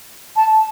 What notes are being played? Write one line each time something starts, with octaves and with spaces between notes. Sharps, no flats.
A5